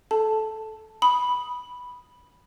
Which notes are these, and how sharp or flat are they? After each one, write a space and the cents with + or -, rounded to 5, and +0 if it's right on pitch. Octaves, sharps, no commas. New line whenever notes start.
A4 -15 A5 +0
B5 -5 D#6 +0